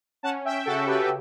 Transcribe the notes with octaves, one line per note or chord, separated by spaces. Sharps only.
C#4 F#5 A5
E5 G5
C#3 F#4 A4
G4 B4
A4